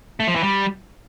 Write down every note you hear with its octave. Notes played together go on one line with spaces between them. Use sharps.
A3
F3
E3
G3